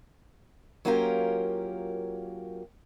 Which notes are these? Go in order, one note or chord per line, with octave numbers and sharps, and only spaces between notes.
F#3 A#3 C#4 F4 G4 A#4